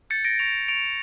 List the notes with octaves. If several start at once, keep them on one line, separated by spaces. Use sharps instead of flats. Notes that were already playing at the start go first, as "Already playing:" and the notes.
G6 A6 C#7
A#6 D7
C#6 D7 F7
C#6 D7 F7